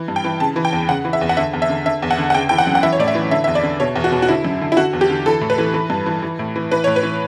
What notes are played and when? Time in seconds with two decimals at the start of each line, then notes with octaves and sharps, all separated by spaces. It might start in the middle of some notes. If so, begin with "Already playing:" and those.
Already playing: E3
0.08 G2
0.16 G5
0.24 E3
0.40 C#3 A5
0.56 E3
0.65 G5
0.73 E2
0.89 C#3 F#5
1.05 E3
1.13 E5
1.21 E2
1.29 F#5
1.37 D3 E5
1.53 E2
1.62 E5
1.70 D3
1.86 D3 E5
2.02 E2
2.11 F#5
2.18 D3
2.30 F#5
2.35 C#3 G5
2.49 E3 G5
2.58 F#5
2.67 F#2
2.75 F#5
2.83 E3 E5
2.93 C#5
2.99 A2 D5
3.08 E5
3.15 E3
3.31 D3 E5
3.44 E2 E5
3.55 D5
3.63 D3
3.80 B2 C#5
3.96 E2
4.04 F#4
4.12 B2
4.22 F#4
4.29 D3 E4
4.45 F#2
4.61 D3
4.72 E4
4.77 D3 F#4
4.93 E2
5.01 G4
5.10 D3
5.26 E3 A4
5.41 A2
5.50 B4
5.58 E3
5.74 E3
5.90 G2
6.06 E3
6.22 E3
6.39 A2
6.56 E3
6.71 E3 B4
6.84 A2 C#5
6.96 B4
7.03 E3